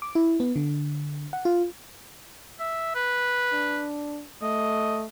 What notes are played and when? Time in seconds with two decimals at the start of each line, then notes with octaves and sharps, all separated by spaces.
0.02 D6
0.15 E4
0.40 B3
0.56 D3
1.33 F#5
1.45 F4
2.60 E5
2.95 B4
3.52 D4
4.42 A3 D#5